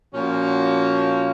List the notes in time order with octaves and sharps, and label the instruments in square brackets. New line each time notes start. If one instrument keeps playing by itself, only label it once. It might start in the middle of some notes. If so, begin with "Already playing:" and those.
[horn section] A#2 F3 A#3 C#4 F#4